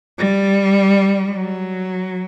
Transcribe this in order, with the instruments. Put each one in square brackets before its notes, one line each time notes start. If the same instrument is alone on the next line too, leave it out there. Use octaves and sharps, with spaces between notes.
[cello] G3
F#3